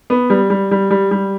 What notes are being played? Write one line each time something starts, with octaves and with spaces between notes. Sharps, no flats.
B3
G3
G3
G3
G3
G3